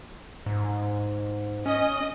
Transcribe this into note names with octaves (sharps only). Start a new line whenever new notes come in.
G#2
C#4 D#5